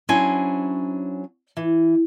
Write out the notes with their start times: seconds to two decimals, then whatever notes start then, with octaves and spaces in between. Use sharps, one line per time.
0.09 F#3 C#4 D4 E4 C5 G#5
1.57 E3